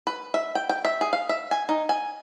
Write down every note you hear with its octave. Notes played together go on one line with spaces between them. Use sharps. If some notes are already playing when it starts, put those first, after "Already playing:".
B4
E5
G5
G5
E5
G#4
F5
E5
G#5
D#4
G#5